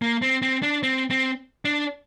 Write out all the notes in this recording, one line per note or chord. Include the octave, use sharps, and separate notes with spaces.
A#3
C4
C4
D4
C4
C4
D4